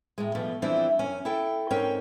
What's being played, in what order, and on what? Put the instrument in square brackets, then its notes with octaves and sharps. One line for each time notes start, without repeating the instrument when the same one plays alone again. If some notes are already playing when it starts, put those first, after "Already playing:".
[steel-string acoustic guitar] A2 G#3
B2 F3 G3 A3
E3 F3 G3 C4 D4 E4
F#2 C#4 G#5
E4 A4 G5
G#2 C4 C#4 A#4 C#5 G5